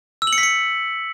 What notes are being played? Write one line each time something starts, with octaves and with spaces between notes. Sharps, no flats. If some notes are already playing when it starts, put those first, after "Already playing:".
E6
F#7
C#7
B6
C#7